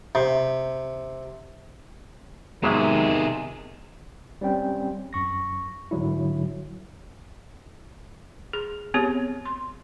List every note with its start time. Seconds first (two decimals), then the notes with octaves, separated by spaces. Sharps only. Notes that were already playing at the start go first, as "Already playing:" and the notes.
0.15 C3
2.63 C3 D#3 F#3 G#3 A#3 B3 G#4 E5
4.41 G3 C4 C#4 G5
5.13 F#2 C#6 A#6
5.91 G#2 D3 F#3 E4
8.53 G#4
8.94 B3 C4 G4 G#4 C#5
9.45 C6